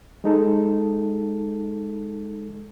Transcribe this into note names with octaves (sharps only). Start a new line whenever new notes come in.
G#3 D#4 A4